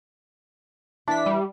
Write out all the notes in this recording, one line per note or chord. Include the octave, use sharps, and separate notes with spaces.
E3 D4 E4 B6
G3